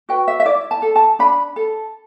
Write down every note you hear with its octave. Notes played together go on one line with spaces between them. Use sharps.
F#4 B4 G5
E5
E5
E4 D5
A5
A4
A5
D4 B5
A4